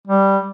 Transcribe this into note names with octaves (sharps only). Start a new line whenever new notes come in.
G3